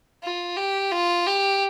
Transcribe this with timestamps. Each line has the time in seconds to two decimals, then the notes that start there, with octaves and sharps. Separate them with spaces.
0.23 F4
0.57 G4
0.92 F4
1.26 G4